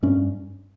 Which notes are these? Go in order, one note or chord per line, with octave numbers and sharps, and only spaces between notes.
G2 C#4